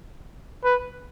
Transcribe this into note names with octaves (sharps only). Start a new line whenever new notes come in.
B4